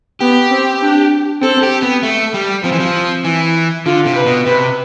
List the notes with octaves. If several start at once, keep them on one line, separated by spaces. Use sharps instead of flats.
B3 G4
C4
D4
C4 A4
G4
B3
A3
G3
F3 C4
E3
F3
E3
D3 F4
C3
B4
B2
C3 B4